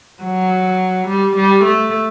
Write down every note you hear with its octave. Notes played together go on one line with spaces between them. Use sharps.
F#3
G3
G3
A3